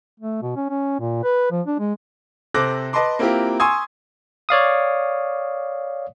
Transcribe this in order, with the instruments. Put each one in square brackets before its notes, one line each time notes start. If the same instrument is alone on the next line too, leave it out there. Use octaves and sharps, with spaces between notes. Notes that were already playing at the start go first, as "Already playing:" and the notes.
[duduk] A3
B2
C#4
C#4
A#2
B4
F3
D4
G#3
[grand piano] C3 A4 C5 D6 F#6 A#6
B4 D#5 A5 B5 C6 D6
A#3 C4 E4 F4 G4 A#4
G#5 C6 C#6 D#6 E6 G#6
[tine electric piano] C#5 D5 F5 D#6